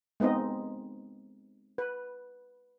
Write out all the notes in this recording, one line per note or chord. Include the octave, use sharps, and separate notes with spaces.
G#3 B3 C4 D#4 D#5
B4